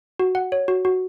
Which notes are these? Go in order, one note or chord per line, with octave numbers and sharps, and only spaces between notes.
F#4
F#5
C#5
F#4
F#4